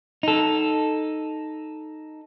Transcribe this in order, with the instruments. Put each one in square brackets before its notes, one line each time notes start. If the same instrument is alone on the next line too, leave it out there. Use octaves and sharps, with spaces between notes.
[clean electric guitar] D#4 A4